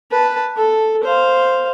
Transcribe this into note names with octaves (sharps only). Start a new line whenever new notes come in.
B4 A5
A4
C5 F5